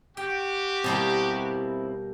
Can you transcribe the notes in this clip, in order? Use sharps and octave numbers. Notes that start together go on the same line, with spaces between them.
F#4 G4 G5
B2 G3 A#3 C4 E4